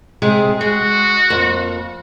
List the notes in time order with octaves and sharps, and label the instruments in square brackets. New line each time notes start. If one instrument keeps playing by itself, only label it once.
[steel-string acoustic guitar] C3 G#3 G#4
[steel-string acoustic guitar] G#3 [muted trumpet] F#4
[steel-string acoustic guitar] F2 A#3